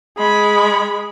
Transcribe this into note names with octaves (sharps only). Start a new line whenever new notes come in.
G#3 B5